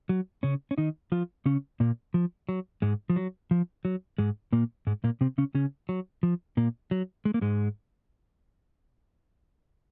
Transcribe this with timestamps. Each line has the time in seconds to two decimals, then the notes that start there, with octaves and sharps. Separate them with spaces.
0.09 F#3
0.43 C#3 C#4
0.71 C#4
0.78 D#3 D#4
1.12 F3 F4
1.46 C#3 C#4
1.80 A#2 A#3
2.14 F3
2.49 F#3
2.82 G#2 G#3
3.10 F3
3.16 F#3
3.51 F3
3.85 F#3
4.18 G#2 G#3
4.52 A#2 A#3
4.87 G#2 G#3
5.04 A#2 A#3
5.21 C3 C4
5.38 C#3 C#4
5.54 C#3 C#4
5.89 F#3
6.23 F3
6.57 A#2 A#3
6.91 F#3
7.25 G#3
7.34 A#3
7.41 G#2 G#3